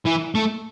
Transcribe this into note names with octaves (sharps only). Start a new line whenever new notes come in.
E3
A3